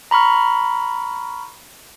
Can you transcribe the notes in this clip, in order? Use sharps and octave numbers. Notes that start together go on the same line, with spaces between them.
A#5 B5 C#6 F6